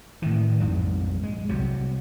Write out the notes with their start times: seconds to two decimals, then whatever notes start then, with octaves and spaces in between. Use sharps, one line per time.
0.22 A2 D#3 E3
0.60 A#1 F2 G#2 G3
1.23 G#3
1.49 C2 C3 F#3